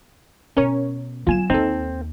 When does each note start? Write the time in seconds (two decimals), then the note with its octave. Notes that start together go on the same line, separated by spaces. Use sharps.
0.57 B2 C#4 A#4 C#5
1.27 F#3 B3 F4 G#5 E7
1.50 D#2 C4 D#4 A4